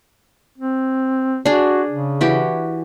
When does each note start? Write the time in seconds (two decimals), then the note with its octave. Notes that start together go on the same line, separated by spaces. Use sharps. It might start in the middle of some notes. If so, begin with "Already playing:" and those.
0.58 C4
1.45 D4 F#4 G#4
1.90 C#3
2.21 E3 F#4 G4